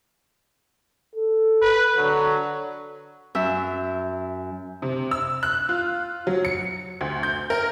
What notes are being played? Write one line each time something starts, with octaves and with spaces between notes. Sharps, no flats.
A4
B4
D3 F#3
F#2 E5 E6
C3
E6
F#6
F4
F#3
C#7
D2
G6
A#4